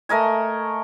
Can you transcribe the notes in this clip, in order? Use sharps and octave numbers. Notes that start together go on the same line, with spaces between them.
A3 A#4 D#5 G#5